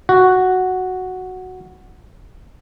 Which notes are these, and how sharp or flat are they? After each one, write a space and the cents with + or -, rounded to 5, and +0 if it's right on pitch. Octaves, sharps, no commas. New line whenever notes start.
F#4 +0